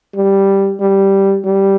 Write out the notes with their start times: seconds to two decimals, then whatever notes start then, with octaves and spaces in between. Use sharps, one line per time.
0.15 G3
0.80 G3
1.45 G3